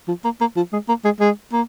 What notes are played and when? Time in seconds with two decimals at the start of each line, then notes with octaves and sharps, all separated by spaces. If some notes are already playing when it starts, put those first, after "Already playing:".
0.08 F3
0.24 A#3
0.41 A#3
0.56 F3
0.73 G#3
0.88 A#3
1.05 G#3
1.20 G#3
1.52 A#3